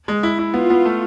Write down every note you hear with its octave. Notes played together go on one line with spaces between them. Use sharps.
G#3
E4
E4
B3 F4
B3
A3